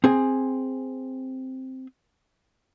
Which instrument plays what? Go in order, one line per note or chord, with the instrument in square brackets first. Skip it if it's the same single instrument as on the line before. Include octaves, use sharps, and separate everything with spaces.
[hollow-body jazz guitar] C4 G#4 G#5